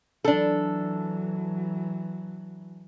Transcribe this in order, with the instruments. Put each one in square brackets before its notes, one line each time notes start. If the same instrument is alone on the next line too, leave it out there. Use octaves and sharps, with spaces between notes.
[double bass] E3 F#3 [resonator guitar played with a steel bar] D4 A4